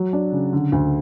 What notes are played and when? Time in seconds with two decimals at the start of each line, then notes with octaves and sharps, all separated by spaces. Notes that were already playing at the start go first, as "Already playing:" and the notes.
Already playing: F#3
0.13 D4
0.32 C#3
0.53 D3
0.72 D2